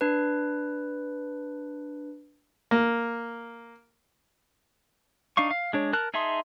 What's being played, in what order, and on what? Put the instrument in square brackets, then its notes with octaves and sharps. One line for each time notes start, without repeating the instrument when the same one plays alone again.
[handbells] D4 B4
[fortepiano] A#3
[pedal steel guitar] D4 D#4 F5 C#6
F5
G#3 D4 C#5
A#4 A5 F#6
D#4 G#4 E5 A5 C6